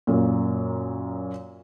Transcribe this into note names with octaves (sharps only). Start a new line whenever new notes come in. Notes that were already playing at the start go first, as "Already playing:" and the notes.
F#2 A#2